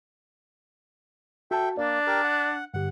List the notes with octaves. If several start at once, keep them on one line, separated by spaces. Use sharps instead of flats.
F#4 A4 E5 G5 A5
A#3 D4 D5
G4 A#4
F#5
G2 D3 G4 F#5